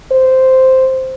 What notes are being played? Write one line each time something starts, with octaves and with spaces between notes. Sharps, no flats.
C5